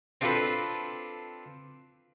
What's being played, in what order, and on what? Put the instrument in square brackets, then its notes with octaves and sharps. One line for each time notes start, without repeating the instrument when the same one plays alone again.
[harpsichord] C4 D4 F4 A4 B4 C5